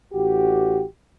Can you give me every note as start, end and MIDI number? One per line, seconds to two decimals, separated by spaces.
0.13 0.83 33
0.13 0.83 66
0.13 0.83 67